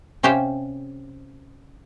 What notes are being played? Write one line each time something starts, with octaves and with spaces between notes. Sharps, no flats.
C3 C#4 G4 C5 F5 G5